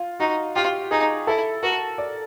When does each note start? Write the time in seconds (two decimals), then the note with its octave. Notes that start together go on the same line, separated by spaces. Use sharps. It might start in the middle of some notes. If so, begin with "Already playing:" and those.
Already playing: F4
0.20 D#4 F#4
0.55 F4 G4
0.91 D#4 G#4
1.27 E4 A4
1.63 F#4 A#4
1.98 D5